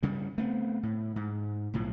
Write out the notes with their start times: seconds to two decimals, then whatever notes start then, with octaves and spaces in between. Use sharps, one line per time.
0.03 G2 C#3 G3
0.38 A3 B3 C4
0.83 A2
1.16 G#2
1.74 B1 A2 F3